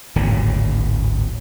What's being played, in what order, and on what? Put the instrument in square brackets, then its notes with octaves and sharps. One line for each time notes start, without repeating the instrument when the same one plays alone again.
[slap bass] D1 G#1 A#2 C#3